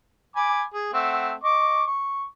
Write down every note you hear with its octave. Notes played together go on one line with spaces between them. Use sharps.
G#5 B5 D6
G#4
A3 C4 F#5
D#5 C#6 D6
C#6